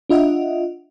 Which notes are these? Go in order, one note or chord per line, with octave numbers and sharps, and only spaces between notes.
D4 F4 D#5 E5 F#5